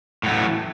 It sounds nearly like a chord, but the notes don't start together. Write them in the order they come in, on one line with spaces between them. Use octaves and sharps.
A2 F#3 A3 E3